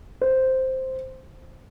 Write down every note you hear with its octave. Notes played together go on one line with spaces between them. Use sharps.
C5